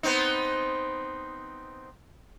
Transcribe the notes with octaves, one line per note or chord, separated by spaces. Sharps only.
B3 C4 D#4